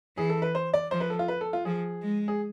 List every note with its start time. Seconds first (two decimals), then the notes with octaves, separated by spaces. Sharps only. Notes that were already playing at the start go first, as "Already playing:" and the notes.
0.17 E3 G#4
0.30 A4
0.42 B4
0.55 C5
0.74 D5
0.91 F3 C5
1.00 B4
1.10 A4
1.19 F4
1.28 B4
1.41 A4
1.53 F4
1.65 F3 G#4
2.02 G#3
2.28 G#4